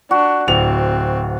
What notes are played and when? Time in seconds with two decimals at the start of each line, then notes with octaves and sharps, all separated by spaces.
0.11 D4 F#4
0.48 D1 C4 F7